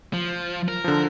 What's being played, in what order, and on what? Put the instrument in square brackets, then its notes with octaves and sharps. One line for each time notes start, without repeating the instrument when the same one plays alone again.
[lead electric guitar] F3
A#4
[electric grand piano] D3 F3